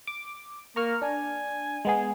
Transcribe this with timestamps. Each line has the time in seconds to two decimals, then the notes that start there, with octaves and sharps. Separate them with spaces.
0.07 D6
0.76 A#3 A#5 C#6 F6
1.02 D4 G#5
1.85 G#3 B3 G#4